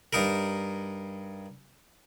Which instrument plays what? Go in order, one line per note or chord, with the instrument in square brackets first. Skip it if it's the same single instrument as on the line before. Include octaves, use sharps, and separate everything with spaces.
[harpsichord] G2 D#4 A#4